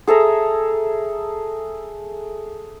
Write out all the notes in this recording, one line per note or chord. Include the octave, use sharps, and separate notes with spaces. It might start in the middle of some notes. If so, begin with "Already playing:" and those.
G#4 A4 E5 A#5